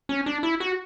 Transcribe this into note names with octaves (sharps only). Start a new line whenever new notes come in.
C#4
D4
E4
F#4